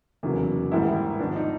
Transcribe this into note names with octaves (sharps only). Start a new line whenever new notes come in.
F1 E2 C#3 F#3 A#3
A1 G#2 D#3 G3 A#3 E4
G#1 G#2 F3 D4
D#4